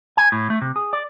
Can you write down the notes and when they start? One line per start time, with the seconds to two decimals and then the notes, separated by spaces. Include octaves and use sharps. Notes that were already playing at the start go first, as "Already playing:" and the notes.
0.17 G#5
0.32 A2
0.50 A3
0.61 C3
0.76 G#4
0.93 D5